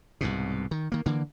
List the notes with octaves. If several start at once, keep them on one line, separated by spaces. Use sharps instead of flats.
C2 G#2 B2
D#3
D#3 A#3
D3 E3 A#3